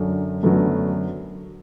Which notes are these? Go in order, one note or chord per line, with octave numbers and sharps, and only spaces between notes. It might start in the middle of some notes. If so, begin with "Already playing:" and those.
Already playing: F#2 D3 F#3
F#2 D3 F#3 A3 B3